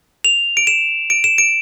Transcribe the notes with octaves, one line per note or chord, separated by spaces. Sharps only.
F7
D7
E7
D7
E7
D7